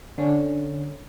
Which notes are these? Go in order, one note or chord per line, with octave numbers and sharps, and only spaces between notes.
D3 C#4